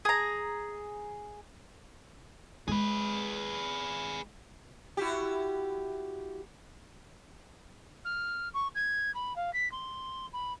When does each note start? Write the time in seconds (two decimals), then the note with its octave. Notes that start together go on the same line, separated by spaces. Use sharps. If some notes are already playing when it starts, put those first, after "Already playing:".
0.05 G#4 A#5
2.68 G#3 G#4 B4
4.97 E4 F#4 G4
8.04 F6
8.54 C#6
8.75 G#6
9.14 B5
9.36 F5
9.53 B6
9.71 C6
10.33 B5